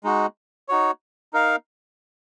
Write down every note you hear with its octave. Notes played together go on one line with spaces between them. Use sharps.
G#3 D#4 F#4
D#4 F#4 C#5
D#4 A#4 F5